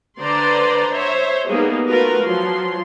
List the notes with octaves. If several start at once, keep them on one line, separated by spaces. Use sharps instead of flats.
D3 B4 C5 D5 A#5 C6
C5 C#5 E5
G3 A#3 B3 D#4 G#4
A3 F4 F#4 A#4 B4
F3 F#3 C6